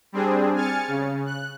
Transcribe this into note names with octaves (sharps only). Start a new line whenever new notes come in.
G3 C4 D4 G#4
G#5 F6 A6 C#7
C#3
F#6